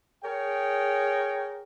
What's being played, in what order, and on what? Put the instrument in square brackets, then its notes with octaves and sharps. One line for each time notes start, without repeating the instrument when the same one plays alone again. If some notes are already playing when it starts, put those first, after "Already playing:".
[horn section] G#4 A#4 C#5 G5